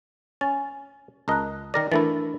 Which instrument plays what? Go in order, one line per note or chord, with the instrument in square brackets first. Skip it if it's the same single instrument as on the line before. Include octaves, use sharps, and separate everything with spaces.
[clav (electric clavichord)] C#4 [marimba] G#5 A6
[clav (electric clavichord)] C#2 A#4 D#5 [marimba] A5 A#5 F#6
[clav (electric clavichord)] D#3 A#4 D5 [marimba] A#6
[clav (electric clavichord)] E3 A3 E4 [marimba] D4 A#4 A6